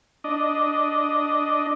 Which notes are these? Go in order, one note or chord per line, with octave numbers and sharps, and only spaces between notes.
D4 D#5